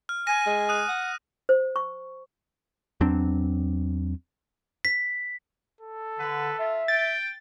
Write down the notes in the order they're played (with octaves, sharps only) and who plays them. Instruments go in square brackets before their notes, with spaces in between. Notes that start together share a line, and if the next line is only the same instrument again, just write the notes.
[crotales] F6
[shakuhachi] G#5 [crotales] A#6 D#7
[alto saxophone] G#3
[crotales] D#6 F#6 D#7
[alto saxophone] F#5
[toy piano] C5
C#6
[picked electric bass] E2 F#3 C4 D4
[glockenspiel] B6
[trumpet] A4
[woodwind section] D3 [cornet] B4
[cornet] F4 [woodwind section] E5
[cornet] G5 [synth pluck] A6